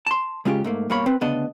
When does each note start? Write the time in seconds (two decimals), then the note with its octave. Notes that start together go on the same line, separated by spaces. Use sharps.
0.06 A5 C6
0.45 C#3 G#3 C#4 F4 G4
0.64 G#2 A3 A#3
0.90 G2 B2 A#3 C#5 B5
1.06 C4 B4
1.21 D2 C#3 B3 D4 D#5 A5